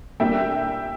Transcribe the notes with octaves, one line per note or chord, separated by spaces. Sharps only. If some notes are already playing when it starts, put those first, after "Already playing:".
A#2 G3 A#3 D4 E5 G5